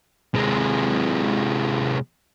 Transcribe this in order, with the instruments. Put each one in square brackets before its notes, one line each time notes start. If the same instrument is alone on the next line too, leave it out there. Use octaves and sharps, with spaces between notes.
[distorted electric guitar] C3 G#3